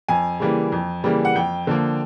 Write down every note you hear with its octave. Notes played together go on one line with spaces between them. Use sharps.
F2 G#5
C#3 E3 G3 A#3
F2
C#3 E3 G3 A#3
F#5
F2 G5
D3 F3 A#3